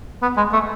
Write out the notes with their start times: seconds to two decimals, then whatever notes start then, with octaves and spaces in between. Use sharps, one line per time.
0.22 B3
0.37 G#3
0.53 A3